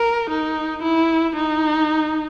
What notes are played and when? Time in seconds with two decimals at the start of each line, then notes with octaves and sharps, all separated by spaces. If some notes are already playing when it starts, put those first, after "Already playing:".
Already playing: A#4
0.30 D#4
0.83 E4
1.36 D#4